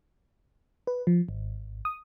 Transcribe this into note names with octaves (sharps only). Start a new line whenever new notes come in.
B4
F3
G#1
D#6